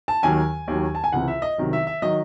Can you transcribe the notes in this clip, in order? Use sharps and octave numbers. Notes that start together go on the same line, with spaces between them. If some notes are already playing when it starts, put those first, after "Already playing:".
A5
D#2 D#3 F#3 G#5
D#2 D#3 F#3
A5
G#5
C#2 C3 E3 F#5
E5
D#5
C2 C3 D#3 F#3
E5
E5
D#3 F#3 D#5